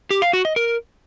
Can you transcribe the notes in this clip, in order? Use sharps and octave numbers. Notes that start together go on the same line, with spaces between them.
G4
F5
F#4
D#5
A#4